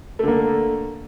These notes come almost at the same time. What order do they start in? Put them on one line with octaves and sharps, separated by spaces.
A3 D3 A#3